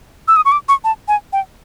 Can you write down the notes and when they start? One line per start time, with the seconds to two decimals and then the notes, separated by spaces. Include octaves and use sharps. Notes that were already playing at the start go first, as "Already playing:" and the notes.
0.28 E6
0.36 D#6
0.45 C#6
0.52 D6
0.69 C#6
0.84 A5
1.08 G#5
1.33 G5